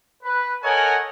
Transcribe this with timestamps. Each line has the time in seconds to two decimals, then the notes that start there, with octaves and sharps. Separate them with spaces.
0.23 B4
0.63 A4 A#4 C#5 D#5 F#5 G#5